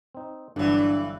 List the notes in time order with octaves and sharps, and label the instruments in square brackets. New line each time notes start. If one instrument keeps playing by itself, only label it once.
[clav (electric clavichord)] C4 D#4
[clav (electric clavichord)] G1 F#3 D5 [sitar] G2 E3 [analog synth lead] D3